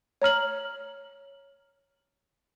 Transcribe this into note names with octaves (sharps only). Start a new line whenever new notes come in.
C#5 A#5 F6 F#7